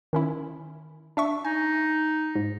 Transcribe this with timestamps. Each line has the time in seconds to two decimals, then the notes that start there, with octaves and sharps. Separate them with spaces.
0.13 D#3 C#4 E4
1.17 D4 E5 C#6
1.45 D#4 G#5
2.36 G#2